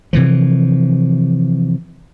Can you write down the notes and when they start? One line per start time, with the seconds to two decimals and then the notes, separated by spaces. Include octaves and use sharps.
0.13 C3 E3 F3